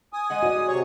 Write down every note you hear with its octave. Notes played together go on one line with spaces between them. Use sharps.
G#5 D#6
G#3 D#5 F#5
F#4 D5
G#4
C3 C#5 C#6